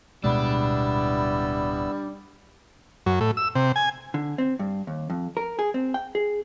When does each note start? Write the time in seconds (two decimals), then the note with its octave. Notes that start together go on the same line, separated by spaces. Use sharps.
0.24 D1 B2 G3 G#3 B3 D4 E4 E6
3.06 F#2
3.21 A2
3.37 E6
3.55 C3
3.76 G#5
4.14 D3
4.38 C4
4.59 G2
4.87 D#2
5.10 F2
5.37 A#4
5.59 G#4
5.74 C4
5.94 G5
6.15 G#4